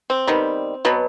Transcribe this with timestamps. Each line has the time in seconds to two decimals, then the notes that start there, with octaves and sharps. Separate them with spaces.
0.10 C4
0.27 D#3 G3 B3
0.85 B2 F#3 B3